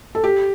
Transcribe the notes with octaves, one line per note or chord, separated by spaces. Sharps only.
A4
G4